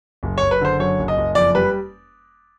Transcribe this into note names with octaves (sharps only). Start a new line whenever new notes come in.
F#1
F#1 C#5
B4
D3 C5
F#2 C#5
F#1
D#5
F#1
F2 D5
G3 B4